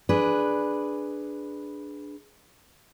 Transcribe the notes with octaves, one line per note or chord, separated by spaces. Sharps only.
D4 G#4 B4